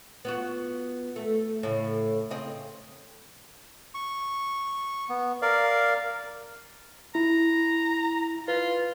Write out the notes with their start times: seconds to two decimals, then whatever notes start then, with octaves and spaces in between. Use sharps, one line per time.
0.25 B3 F4 F#4
1.16 A3
1.63 A2 C#3
2.30 C#3 C4 D#5
3.95 C#6
5.09 B3
5.42 A#4 D5 F5
7.15 E4 A#5
8.48 F4 B4